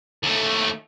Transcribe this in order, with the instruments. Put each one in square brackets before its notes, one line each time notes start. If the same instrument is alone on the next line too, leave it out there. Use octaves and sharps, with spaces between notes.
[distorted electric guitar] D#2 A3